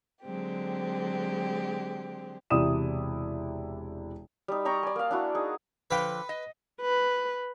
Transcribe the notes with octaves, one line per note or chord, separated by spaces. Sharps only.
D3 F#3 G#3 C4 G4
E1 C3 E4 D5 D#6 E7
G3 D#4
D5 G5 A#5 C#6
D5 G#5
A#3 F5
D4 E4 F#4
D#4 G#4
D3 F3 B4 G5
D#5
B4